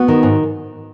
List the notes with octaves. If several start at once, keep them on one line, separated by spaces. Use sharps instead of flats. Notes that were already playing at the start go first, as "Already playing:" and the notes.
Already playing: B3 F#4
D#3
G#2